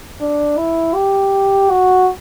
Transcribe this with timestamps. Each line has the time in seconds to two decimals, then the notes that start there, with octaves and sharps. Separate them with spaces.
0.21 D4
0.58 E4
0.95 G4
1.70 F#4